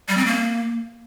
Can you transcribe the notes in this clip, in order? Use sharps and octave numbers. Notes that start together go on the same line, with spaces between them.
G3
C4
A#3